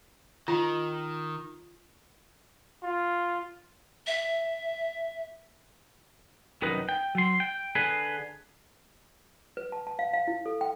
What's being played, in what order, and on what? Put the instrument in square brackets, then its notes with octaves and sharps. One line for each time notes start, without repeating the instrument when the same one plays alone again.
[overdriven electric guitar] D#3 [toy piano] F4
[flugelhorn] F4
[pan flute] E5
[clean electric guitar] C2 F#2 D#3 D#4 B4
G5
F#3 C6
G5
D3 G#4 B4
[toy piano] B4
A5
A5
F5
F5
E4
A4
G5